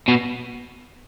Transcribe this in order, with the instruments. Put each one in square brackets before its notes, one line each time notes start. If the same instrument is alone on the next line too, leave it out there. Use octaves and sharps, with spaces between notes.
[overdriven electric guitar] B2